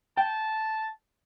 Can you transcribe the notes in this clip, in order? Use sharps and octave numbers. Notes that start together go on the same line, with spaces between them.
G5 A5